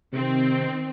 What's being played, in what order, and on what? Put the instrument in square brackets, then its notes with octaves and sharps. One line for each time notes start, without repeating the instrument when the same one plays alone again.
[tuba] C3 [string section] D#3 C4